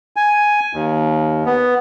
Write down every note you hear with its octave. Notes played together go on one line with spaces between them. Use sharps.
G#5
D#2
B3